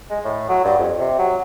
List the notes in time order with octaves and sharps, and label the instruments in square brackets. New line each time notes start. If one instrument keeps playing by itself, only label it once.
[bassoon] G#3
A2
F#3
G2
F2
C3
F#3